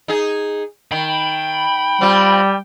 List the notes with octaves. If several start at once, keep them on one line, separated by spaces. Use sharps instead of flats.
D#4 G#4
D#3 G5 B5
G3 C4 F4